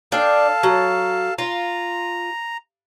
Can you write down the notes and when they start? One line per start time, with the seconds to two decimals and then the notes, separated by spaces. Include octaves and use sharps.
0.12 D4 A4 F5 G5 A5
0.63 F#3
1.38 F4 A#5